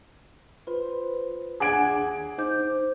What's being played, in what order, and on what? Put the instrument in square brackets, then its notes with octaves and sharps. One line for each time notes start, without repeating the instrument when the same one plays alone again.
[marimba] F4 [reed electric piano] B4 C5
[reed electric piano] D#2 D4 G#6 [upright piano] G#4 F#5 D7 [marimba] D6
[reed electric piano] D#2
[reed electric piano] D#4 [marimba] C5 D6 G6